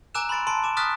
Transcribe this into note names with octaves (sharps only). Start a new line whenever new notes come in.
G#5 A#5 D6 E6 F#6 E7
B5 C6 A6 D7
A5 C6 D7
A5 D6 E7
C#6 D#6 F6 F#6 A6 B6